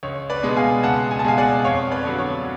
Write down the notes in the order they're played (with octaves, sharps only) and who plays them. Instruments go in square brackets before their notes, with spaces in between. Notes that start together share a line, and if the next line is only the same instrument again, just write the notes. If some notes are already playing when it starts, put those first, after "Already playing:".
[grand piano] C#2 C#5
B4 D5
B2 G#3
F5 G#5
C#2 F#5 A5
G#5
A5
B2 G#3 F5 G#5
D5 F#5
F2 C#5 F5
B4 D5
D3 F#3 B3
C#5